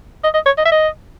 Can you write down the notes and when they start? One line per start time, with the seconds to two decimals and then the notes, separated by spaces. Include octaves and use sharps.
0.24 D#5
0.34 D#5
0.46 C#5
0.58 D#5
0.65 E5
0.72 D#5